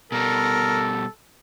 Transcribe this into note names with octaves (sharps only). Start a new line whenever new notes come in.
B2 G3 A4 A#4